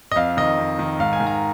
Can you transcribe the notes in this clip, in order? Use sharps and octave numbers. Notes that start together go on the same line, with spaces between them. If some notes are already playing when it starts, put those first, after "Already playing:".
D#5
F2 F5
D#3 D#5
F2
D#3
G#2 F5
G#5
D#3
A#5